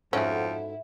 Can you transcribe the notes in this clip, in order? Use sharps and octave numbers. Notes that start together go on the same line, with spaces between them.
F2 G#2 C#4 E4 F#4 G#4 A4